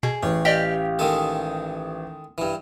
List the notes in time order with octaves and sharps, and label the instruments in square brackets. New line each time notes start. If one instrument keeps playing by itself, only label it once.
[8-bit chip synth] B2 [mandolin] G#4
[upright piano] A1 [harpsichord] C#4
[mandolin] G4 F5 [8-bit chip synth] D5 D#5 G5
[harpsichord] D#3 G#3 A4
G2 E3